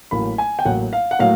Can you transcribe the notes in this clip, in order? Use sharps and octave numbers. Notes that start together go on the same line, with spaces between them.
A1 A2 F#3 A#3 B5
G#5
G5
A1 A2 F#3 A#3 F#5
F5
F#5
A2 F#3 A#3 F5